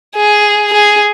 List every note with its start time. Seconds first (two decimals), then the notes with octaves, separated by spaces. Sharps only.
0.15 G#4
0.73 G#4